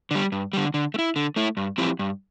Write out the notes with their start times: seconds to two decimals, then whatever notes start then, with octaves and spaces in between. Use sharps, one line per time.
0.11 D3 G3
0.32 G2
0.53 D3 G3
0.74 D3
0.94 A3
0.99 E4
1.16 D3
1.36 A3 E4
1.57 G2
1.78 F3 C4 E4 G4
1.99 G2